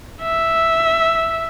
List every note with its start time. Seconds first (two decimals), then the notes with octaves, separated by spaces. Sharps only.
0.22 E5